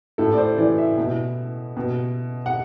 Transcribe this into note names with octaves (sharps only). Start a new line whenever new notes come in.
A2 A4
D5
C5
E3 D5
E5
B2
B2
F#5